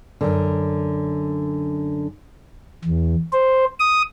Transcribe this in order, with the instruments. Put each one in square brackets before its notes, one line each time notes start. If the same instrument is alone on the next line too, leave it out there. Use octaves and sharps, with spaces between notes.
[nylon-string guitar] F#2 D3
[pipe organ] E2
C5
D#6